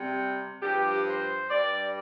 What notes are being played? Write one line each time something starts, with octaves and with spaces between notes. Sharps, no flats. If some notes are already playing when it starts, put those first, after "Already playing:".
Already playing: C3 G3
G2 F3 G4
C5
G2 G3 D5